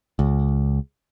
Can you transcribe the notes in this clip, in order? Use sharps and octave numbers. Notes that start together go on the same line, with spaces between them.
C#2